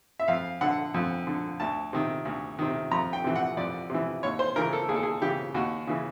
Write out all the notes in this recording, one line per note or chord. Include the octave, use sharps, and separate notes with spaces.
E5
F2 F5
D3 F#5
F2
D3
D2 A5
C3 D#3
D2
C3 D#3
F2 A#5
G5
C3 E3
F#5
F2 D5
C3 E3
D#2 C#5
C5
C#3 E3 A#4
A4
D#2 G#4
A4
G#4
C#3 E3 G4
D#2 F#4
C#3 E3